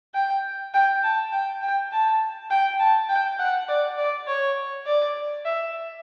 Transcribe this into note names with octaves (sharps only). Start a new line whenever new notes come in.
G5
G5
A5
G5
G5
A5
G5
A5
G5
F#5
D5
D5
C#5
D5
E5